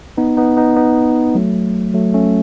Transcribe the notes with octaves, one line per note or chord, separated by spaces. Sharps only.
B3 D#4
B3 D#4
B3 D#4
B3 D#4
F#3 A3
F#3 A3
A3 C#4